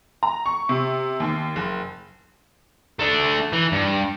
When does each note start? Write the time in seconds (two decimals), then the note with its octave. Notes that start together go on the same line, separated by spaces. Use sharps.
0.23 A#5
0.46 C#6
0.69 C3
1.20 D#2
1.56 F#1
2.99 A3 D4
3.53 E3
3.72 G2